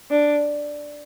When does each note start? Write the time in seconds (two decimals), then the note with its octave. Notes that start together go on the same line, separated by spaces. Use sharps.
0.11 D4